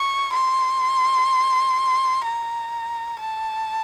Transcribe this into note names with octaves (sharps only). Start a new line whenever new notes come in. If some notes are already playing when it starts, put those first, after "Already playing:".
Already playing: C#6
C6
A#5
A5